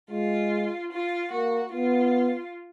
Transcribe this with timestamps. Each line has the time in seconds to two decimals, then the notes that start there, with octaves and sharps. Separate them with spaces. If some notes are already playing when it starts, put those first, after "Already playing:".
0.11 G#3 F4
0.92 F4
1.32 A#3 F#4
1.73 B3 F4